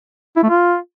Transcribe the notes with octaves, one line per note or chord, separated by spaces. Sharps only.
E4
A3
F4